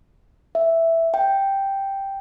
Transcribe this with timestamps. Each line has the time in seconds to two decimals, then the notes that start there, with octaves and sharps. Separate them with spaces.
0.55 E5
1.14 G5